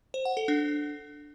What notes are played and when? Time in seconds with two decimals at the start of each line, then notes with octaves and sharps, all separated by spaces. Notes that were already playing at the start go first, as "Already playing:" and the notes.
0.14 C5
0.25 F#5
0.37 A4
0.48 D4